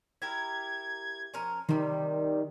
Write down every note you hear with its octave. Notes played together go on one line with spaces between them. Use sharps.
E4 G4 A#4 G#6
F3 C#4 A#4
C3 D#3 G3